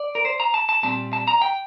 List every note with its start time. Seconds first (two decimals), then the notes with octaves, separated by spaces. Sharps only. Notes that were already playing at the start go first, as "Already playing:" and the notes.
Already playing: D5
0.15 A#4
0.25 C5
0.40 A#5
0.54 A5
0.69 A5
0.83 A#2 G3 C4 A5
1.13 A5
1.28 A#5
1.42 G5